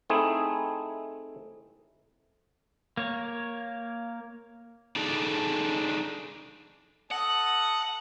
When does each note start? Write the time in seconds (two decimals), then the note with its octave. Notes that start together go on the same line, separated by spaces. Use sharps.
0.10 A3 C4 D#4 E4 G#4
2.97 A#3 C#5
4.96 D4 D#4 G#4 A4 D5
7.11 A4 D#5 F#5